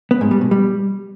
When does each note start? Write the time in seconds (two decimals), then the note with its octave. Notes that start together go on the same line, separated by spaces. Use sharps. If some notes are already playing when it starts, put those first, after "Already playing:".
0.11 B3
0.21 G#2
0.31 G3
0.41 B2
0.51 G3